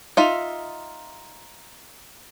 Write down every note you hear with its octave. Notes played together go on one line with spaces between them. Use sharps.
D#4 F4 E5